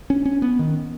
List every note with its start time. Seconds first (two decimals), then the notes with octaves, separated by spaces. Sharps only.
0.10 C#4
0.25 C#4
0.42 B3
0.59 D#3